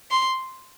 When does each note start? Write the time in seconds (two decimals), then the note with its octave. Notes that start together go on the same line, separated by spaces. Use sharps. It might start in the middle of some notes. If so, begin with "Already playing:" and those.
0.11 C6